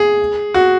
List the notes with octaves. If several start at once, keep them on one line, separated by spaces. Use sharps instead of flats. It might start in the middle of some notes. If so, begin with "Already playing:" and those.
Already playing: G#4
F#4